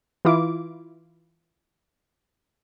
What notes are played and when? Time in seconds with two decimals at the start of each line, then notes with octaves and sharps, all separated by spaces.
0.25 E3 E4 F4 D6